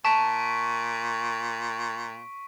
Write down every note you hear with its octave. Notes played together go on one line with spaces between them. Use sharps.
A#2 A5 C#6 B6 D7